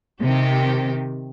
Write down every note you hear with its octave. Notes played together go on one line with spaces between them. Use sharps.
C3 D#3 G4